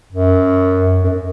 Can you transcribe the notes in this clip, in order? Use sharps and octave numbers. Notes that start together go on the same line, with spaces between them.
F#2
F#2